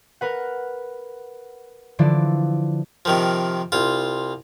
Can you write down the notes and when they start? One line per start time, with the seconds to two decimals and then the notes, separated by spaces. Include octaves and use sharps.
0.21 A#4 B4 F#5
1.99 D3 E3 F3 D5
3.05 C3 D#3 F3
3.72 C2 F4